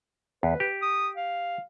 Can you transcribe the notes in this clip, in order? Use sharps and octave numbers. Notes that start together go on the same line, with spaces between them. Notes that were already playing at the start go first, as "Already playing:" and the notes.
E2 B4
G4
D#6
F5